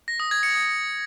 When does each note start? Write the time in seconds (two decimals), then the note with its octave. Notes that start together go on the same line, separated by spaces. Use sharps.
0.08 A#6
0.20 D#6
0.31 G#6
0.43 C#7
0.55 D#6